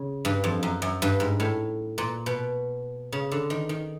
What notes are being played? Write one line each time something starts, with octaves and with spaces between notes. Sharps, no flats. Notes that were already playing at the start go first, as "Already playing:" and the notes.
Already playing: C#3
G2
F2
F#2
F#2
G2
G#2
A2
A#2
B2
C#3
D3
D#3
D#3